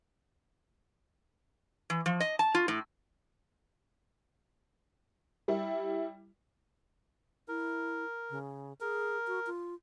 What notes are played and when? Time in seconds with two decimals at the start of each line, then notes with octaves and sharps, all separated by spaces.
1.90 E3
2.06 F3
2.20 D#5
2.39 A5
2.55 F4
2.68 A2
5.48 G3 E4
7.48 E4 A#4
8.30 C#3
8.81 G#4 A#4
9.27 F#4
9.47 F4